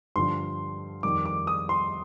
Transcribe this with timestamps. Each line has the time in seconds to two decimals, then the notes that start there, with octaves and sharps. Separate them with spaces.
0.16 G2 D3 F3 C6
1.03 F2 D#3 G3 D6
1.26 D6
1.47 D#6
1.69 C6